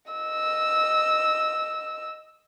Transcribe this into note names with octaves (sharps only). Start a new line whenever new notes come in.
D#5 E6